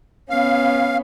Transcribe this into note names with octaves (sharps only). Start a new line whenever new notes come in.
B3 C#4 F5